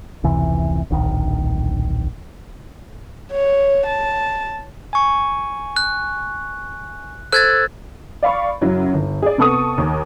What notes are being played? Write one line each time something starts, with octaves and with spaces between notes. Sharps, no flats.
F1 C#2 C3 E3
D1 A#1 D#3
C#5
A5
G#5 C#6
F#6
A4 C5 E6 F#6 G#6 A6
D5 F5 B5 C#6
F#2 C#3 F#3 E4
G1
G#4 D5
C3 B3 A4 C#6 D#6
D#2